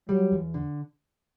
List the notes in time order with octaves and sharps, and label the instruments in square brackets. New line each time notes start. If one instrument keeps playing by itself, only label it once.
[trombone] F#3 [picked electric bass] G3
[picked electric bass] E2
D3